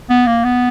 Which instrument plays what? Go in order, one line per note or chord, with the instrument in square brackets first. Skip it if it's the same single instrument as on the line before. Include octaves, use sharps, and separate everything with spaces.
[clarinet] B3
A#3
B3